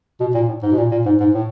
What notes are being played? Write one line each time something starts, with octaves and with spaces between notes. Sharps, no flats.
B2
A#2
A2
G#2
B2
A#2
A#2
G#2
G#2
A2